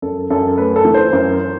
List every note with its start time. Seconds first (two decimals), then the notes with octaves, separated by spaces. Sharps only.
0.02 F#2 A4
0.30 F#2 A4
0.58 A3 B4
0.76 A4
0.85 E3
0.94 C5
1.13 F#2